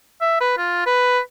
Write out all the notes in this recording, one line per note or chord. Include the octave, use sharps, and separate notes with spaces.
E5
B4
F4
B4